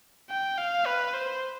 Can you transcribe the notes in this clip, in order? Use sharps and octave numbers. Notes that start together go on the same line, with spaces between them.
G5
F5
B4
C5